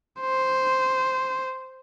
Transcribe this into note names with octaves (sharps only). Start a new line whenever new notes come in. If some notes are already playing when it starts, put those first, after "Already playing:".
C5